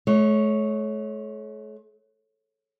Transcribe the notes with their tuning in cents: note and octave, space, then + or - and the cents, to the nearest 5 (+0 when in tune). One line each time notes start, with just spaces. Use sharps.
A3 -45 C#5 +0